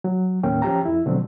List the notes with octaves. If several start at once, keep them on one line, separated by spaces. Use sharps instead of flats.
F#3
D#2 A2 A#3 C#4 G5
F3 C#4 G4 G5 A#5
F2 E4
B2 D3 F3 F#3 A3 C4